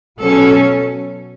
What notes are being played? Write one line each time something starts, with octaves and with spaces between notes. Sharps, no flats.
B2 F#3 C#4 A4